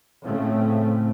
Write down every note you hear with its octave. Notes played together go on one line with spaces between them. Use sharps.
A2 C#3 A3 C4